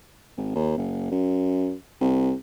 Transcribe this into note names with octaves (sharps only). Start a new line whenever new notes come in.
G#1
D#2
F#1
F#2
C2